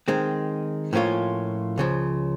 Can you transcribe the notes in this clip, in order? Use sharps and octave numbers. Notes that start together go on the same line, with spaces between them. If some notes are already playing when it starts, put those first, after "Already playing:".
D#3 G#3 C4
A2 F3 A#3 C#4 F4
C#2 C#3 F3